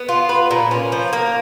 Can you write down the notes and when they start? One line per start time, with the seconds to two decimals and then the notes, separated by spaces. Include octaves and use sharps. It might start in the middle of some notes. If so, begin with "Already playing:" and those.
Already playing: B3
0.09 F4
0.29 B4
0.51 A#2
0.71 C#4
0.92 F3
1.13 A#3